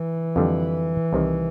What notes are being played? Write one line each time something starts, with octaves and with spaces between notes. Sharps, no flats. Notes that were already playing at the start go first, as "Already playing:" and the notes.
Already playing: E3
F2 D3 G3
C2 C3 D#3